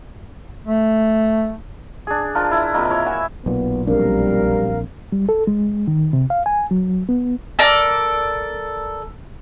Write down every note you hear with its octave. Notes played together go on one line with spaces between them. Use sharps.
A3
D4 G#4
F3 D4 F4 A#4
E4
C3 F3 A#3 D#5
E4 C#5
F#4 E5 G#5 B5
B1 A#2 B3
A#1 G3 C4 D4 A#4 F5
G3
A4
G#3
D#3
C3
F5
G#5
F#3
B3
A4 A#4 D5